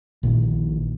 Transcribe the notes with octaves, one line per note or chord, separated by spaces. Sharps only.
A#1 A#2 D#3